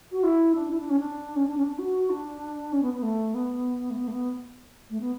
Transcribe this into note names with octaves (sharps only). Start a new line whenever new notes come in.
F#4
E4
D4
E4
D4
C#4
D4
C#4
D4
C#4
D4
F#4
D4
C#4
B3
B3
A3
B3
A3
B3
A3
B3
A3
B3